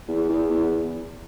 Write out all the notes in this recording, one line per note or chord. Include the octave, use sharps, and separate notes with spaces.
E2
E2
E2